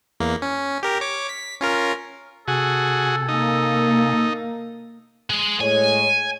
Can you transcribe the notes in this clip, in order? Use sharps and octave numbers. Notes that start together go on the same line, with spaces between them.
E2 A#3
C#4
G4 A#4
C#5 D6
B6
C#4 F4 A#4
C3 F#4 G#4 A4 G#5
A#3 D#4
G#3
A2 G#3 C#5 G#5